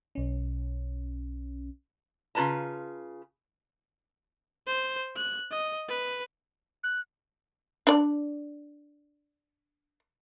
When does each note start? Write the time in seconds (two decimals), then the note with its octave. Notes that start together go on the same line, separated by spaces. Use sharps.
0.15 B1 C#4
2.35 C#3 F4 B4 A5 A#5
4.67 C5
5.16 F#6
5.51 D#5
5.89 B4
6.84 F#6
7.87 D4 D5